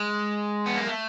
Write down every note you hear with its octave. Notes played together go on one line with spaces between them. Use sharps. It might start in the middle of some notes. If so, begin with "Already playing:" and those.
Already playing: G#3
B3
A#3
A3